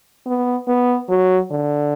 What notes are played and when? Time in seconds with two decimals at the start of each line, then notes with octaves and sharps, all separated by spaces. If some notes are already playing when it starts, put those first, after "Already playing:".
0.26 B3
0.68 B3
1.09 F#3
1.51 D3